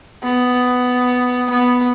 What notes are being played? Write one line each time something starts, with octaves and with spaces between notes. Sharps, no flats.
B3
B3